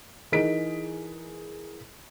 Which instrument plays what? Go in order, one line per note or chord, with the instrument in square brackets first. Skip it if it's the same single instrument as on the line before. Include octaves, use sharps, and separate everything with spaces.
[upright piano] E3 D#4 G#4 A#4 B6 D7